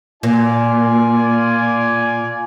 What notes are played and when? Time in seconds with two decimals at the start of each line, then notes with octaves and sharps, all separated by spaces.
0.23 A#2 F4 D5 G#5